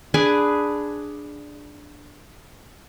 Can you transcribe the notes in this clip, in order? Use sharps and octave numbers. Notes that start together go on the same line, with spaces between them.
D4 G#4 B4 G#5